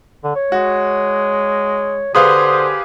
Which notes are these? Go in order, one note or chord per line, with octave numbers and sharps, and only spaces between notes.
D3
C#5
G#3 F#4
D3 G4 G#4 B4 C5 F5 C6 D#6